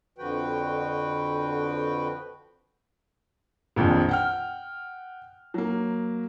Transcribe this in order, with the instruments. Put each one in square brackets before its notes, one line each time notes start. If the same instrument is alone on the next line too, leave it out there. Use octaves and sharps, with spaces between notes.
[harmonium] F2 D3 F3 F#4 B4 G5
[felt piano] A#1 F2 A#2 D#3
F#5 G5 F6
F#3 A#3